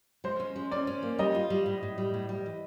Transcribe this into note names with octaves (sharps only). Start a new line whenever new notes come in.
G#3 C5
C#4
G#3
C#4 D5
C#4
A#3
G3 D#5
F4
G3
A2
A2
G3
A2
G3
E3